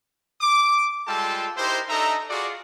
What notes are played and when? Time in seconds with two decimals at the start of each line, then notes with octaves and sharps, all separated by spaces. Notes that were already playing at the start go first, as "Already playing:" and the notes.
0.41 D6
1.07 G3 G#3 F4 A4 G5 A5
1.57 D#4 E4 G4 A#4 C5
1.88 D4 D#4 A4 D#5 E5 A#5
2.30 F4 F#4 G#4 D5